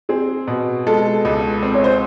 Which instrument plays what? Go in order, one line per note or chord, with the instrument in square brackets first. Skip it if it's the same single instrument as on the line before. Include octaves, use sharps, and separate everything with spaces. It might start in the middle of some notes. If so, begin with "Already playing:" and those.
[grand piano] C4 [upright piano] G#4
[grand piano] B2
[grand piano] G#3 [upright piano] A4
[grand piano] C#2
C4
[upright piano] C#5
C5